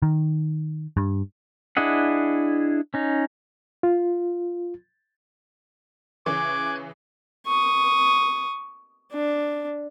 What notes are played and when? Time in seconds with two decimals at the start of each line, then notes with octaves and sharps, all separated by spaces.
0.02 D#3
0.97 G2
1.77 D4 E4 G#4 D#5 F#5
2.94 C#4 D#4
3.83 F4
6.26 C#3 E3 C#5 G#5 D6 F#6 G#6
7.47 C#6 D#6
9.12 D4